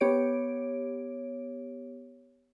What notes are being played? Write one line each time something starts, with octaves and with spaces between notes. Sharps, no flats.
B3 G4 C#5 D7